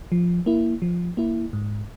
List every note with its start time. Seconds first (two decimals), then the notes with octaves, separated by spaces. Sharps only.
0.12 F3
0.46 A#3 E4
0.82 F3
1.17 A#3 E4
1.53 G#2